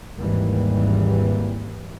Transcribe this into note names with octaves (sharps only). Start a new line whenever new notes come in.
G#1 D#2 E3 G3 A#3